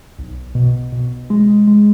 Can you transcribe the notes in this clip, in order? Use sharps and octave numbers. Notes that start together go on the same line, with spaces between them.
B1
B2
B2
G#3
G#3